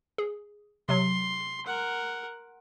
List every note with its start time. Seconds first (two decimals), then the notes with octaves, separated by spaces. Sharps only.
0.18 G#4
0.89 C3 F#3 C6
1.66 A#4 F#5